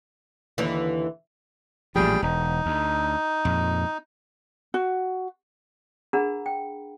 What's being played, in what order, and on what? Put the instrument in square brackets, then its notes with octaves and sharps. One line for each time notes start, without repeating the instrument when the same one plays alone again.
[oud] D#2 D3 E3
[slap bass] A1 A#2 F3 [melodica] G3 G#4 G5
[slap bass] E1 [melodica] D#4
[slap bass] D2
F2 A#2
[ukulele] F#4
[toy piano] D4 G#4 A#4 F#5 A#5 B5
G5